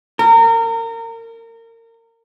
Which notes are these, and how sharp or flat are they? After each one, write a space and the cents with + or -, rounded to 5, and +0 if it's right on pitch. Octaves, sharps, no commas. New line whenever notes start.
A#4 -30